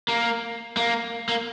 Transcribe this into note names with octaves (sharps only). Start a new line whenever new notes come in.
A#3
A#3
A#3